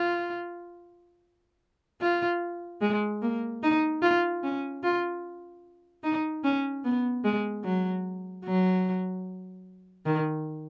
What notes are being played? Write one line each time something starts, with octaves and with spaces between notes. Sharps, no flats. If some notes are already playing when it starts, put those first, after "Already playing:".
Already playing: F4
F4
G#3
A#3
D#4
F4
C#4
F4
D#4
C#4
B3
G#3
F#3
F#3
D#3